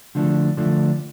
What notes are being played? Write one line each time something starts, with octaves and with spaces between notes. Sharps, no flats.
D3 F3 A3 D4
D3 F3 A3 D4